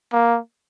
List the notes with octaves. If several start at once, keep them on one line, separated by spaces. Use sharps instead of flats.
A#3